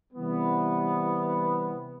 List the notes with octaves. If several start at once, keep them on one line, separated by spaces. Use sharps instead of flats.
C3 E3 G3 B3